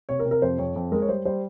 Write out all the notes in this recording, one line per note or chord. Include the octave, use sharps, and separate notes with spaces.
C3 C#5
A#4
C3
A#4
F2 C5
F2 C#5
F2
G#3 A#4
C#5
G3 C5
G3 C5